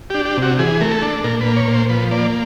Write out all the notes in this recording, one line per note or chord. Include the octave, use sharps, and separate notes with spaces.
D4 G4
G4
C3
F#4
E3 G#4
A3 A#4
A4
D4
A#2 A#4
B4
A#3
C#5
A#2
C5
F3 B4
A#3 D5